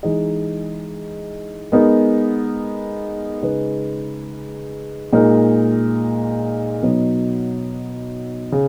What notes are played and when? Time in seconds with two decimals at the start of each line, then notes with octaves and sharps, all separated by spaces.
0.03 E3 G#3 D#4 G#4 D#5
1.72 G#3 B3 D#4 A#4
3.42 C#3 G#3 D#4 G#4 B4
5.13 A#2 G#3 D#4 A#4
6.82 B2 F#3 B3 D#4
8.52 C#3